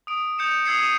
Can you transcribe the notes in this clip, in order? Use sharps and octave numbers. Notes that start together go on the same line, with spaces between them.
D#6 D7
D#6 G6 C#7 E7
D#6 E6 G#6 C7 C#7
D#6 E6 D#7 E7